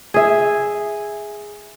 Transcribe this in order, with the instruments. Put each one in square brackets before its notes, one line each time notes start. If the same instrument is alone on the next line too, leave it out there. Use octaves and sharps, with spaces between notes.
[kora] G#4 E5